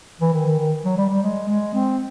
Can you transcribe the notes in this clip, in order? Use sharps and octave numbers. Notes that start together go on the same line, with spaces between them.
E3
D#3
D#3
D#3
F#3
G3
G3
G#3
G#3
C4